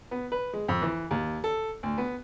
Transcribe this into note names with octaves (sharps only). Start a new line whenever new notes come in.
B3
B4
G#3
F2
E3
D#2
A4
D2
B3